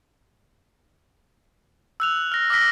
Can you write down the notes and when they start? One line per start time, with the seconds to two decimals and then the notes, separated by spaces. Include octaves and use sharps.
2.00 E6 F#6 F7
2.32 F6 A#6
2.50 D6 E6 F6 A#6 B6